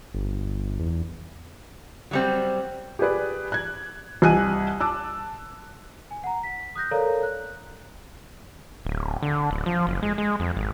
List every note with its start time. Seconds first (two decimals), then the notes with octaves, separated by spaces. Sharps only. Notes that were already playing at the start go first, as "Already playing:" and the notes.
0.14 G1
0.79 E2
2.11 F#3 G3 C4
2.99 G4 G#4 B4 D5
3.52 F#6 G#6
4.22 C2 D#5 G#5 F#6 D#7
4.80 A5 D6 E6 F#6
6.11 G#5
6.24 F#5 A#5
6.43 B6
6.75 D#6 F#6 G6 A#6
6.91 A4 A#4 C#5 D5 F5 A#5
7.23 F#6
8.85 D1
9.22 D3
9.51 D1
9.66 F3
9.87 F#1
10.03 G#3
10.18 G#3
10.40 F2
10.57 G#1